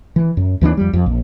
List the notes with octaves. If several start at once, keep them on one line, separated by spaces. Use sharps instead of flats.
E3
F#2
D#2 E3 G#3 D4
F2 G3
F2
A#1